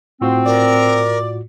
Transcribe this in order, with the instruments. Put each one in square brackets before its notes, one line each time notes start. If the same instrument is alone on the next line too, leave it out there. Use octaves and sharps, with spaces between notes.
[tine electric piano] A2 F4 F#4 [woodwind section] C4
[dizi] A#4 [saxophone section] D5